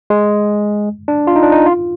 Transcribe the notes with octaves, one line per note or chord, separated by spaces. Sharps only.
G#3
D4
F4
D#4
D4
D#4
F4